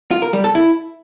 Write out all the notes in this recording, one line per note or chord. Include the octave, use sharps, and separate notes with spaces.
F4
A#4
G3
A4
E4